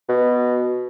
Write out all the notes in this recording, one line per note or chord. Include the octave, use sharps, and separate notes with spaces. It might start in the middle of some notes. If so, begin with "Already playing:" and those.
B2